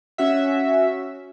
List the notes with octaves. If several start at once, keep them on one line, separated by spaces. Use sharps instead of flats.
C#4 F#4 E5